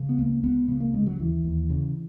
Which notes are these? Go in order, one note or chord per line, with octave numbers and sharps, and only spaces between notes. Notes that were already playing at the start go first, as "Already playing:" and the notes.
Already playing: C#3
B3
C#2 A#3
C#2 B3
C#3 B3
A#3
C#3 G#3
F#3
D#2 E3
D#2
C#3